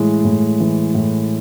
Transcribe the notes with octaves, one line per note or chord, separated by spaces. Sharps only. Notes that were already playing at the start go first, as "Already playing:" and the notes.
Already playing: A2 E3 G#3
A2
E3
A2